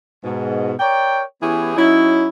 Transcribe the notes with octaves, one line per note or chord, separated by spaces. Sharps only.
G#2 B2
A#4 C#5 D5 G5
E3 B3 C#4 E4 G4 G#4
F#3 C#4 D#4 E4